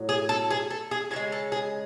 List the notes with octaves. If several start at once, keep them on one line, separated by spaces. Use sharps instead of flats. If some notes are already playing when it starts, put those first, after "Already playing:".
Already playing: A2 F#3
G#4
A4
G#4
A4
G#4
C#3 E3 G#4
G#3
A4
G#4